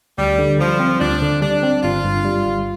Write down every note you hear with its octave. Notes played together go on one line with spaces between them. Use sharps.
D2 G3
D3
F3 G3
C4
D2 D4
D3
G3 D4
C4
G1 F4
G2
G3
G1